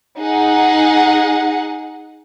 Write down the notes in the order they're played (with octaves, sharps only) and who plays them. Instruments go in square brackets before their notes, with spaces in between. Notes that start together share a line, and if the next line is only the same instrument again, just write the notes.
[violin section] D#4 G#4 F#5